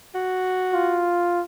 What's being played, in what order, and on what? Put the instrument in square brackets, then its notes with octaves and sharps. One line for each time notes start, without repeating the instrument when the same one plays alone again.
[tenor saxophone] F#4
[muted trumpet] F4